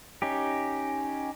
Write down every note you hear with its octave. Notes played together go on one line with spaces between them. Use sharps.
C#4 D#4 G4